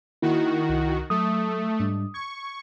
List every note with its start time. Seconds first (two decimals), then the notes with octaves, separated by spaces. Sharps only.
0.22 D#3 A#3 E4 F#4
0.69 C2
1.10 F#3 A3 D#6
1.80 G#2 G3 D4
2.14 C#6 G#6